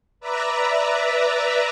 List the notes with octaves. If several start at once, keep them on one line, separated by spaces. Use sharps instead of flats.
B4 D5 E5 A#5